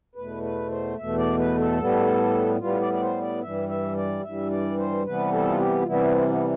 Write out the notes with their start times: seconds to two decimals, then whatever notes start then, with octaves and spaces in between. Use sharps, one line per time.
0.15 E2 B2 A3 B4
0.43 B4
0.70 C5
0.97 E2 B2 A3 E5
1.17 D5
1.38 B4
1.58 A4
1.79 A2 G3 B3
2.60 A2 G3 B3 F4
2.81 D5
2.93 D5
3.01 C5
3.21 D5
3.42 G2 E3 G3 E5
3.69 E5
3.97 D5
4.23 G2 E3 G3 E5
4.51 D5
4.79 C5
5.05 C3 E3 G3 B3 B4
5.32 A4
5.48 F4
5.59 G4
5.81 F4
5.86 C3 E3 G3 B3 E4
6.08 C4
6.28 B3